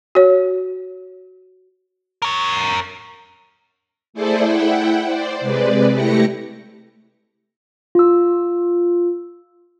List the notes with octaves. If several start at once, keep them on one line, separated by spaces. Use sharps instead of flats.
F#4 C#5
A#4 C#5
A3 E4 G#4 A4 C5 D5
E4 F#5 G5
C5 D5
C3 G#3 B4 D5
A3 E4 G4 A#6 C#7
F4 E6